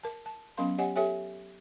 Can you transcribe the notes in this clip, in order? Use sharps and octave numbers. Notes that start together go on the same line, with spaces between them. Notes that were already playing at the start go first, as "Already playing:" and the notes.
A#4 A5
A5
F#3 B3 C#4 A#4 F5 C6
G4 C#5 D#5 F#5 G#5
G4 A4 C#5 E5 G5 G#5